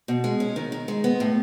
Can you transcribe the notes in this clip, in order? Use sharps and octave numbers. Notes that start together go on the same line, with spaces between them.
B2
G#3
C#4
D#3
D#3
G#3
B3
A2